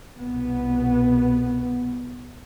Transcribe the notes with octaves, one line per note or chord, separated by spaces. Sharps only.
C2 B2 B3